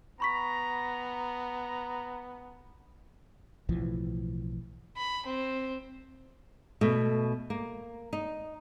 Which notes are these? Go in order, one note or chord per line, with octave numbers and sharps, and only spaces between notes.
B3 A#5 B5 C#6 B6
B1 A2 E3 F3
B5
C4
B2 A3
A#3
D#4